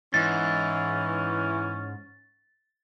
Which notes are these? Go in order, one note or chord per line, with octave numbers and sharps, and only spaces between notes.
G#2 E3 C#4 A6